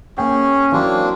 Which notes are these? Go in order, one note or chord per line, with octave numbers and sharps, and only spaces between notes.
A#3 C#4 G#4 G5
E3 F#3 A#3 C4 D4